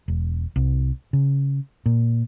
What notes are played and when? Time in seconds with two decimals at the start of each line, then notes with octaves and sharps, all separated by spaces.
0.08 E1
0.56 C2
1.13 C#3
1.86 A#2